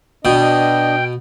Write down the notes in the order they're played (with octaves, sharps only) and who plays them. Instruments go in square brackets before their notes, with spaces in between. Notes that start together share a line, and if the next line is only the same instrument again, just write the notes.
[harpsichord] B2 [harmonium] D4 D#5 [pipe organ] G5